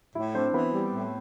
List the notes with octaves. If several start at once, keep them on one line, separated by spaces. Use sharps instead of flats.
A2 E4 E5
C4 D4 C5
E3 B3 B4
G3
A2